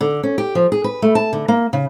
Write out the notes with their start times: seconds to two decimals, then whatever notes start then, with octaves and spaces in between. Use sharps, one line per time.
0.01 D3
0.23 C#4
0.38 G4
0.55 F3
0.72 G#4
0.84 B4
1.02 A3
1.15 A5
1.33 D3
1.48 A#3
1.73 C#3